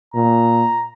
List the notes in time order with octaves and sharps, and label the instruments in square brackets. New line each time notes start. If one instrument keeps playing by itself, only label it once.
[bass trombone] A#2 [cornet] A#5